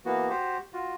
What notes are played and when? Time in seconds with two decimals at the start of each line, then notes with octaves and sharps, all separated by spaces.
0.05 E3 A#3 B3 F#4
0.30 F#4 G4 C5
0.73 F4 F#4